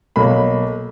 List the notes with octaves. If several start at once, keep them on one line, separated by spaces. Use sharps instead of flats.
B1 A#3 B5